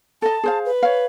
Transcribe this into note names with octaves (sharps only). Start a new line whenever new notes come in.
A4 D#5 A5
G#4 C5 F5
B4
C#5 F5